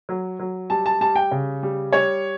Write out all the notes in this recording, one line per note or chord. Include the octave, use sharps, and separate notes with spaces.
F#3
F#3
G3 A5
A5
G3 A5
G5
C#3
G3
G3 C#5